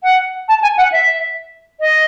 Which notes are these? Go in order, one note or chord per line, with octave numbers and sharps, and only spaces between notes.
F#5
A5
G#5
F#5
E5
D#5